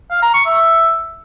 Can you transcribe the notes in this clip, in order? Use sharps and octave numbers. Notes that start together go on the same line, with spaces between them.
F5
A#5
C#6
E5